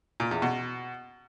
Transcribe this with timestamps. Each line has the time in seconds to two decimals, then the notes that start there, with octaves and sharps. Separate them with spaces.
0.20 A#2
0.31 E2
0.42 B2